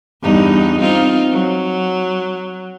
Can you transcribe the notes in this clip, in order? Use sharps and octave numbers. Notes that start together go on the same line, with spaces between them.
E2 G2 D#4
C4 D#4 F4
F#3